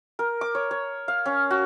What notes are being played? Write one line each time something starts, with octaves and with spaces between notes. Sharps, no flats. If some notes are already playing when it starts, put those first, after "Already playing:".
A#4
D6
C#5
C#5
F5
C#4
F#4